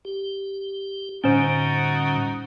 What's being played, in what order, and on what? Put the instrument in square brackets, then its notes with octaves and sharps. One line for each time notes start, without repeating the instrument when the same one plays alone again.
[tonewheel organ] G4
[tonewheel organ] A2 D3 G3 [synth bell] C#4 C5 [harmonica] D#4 F#4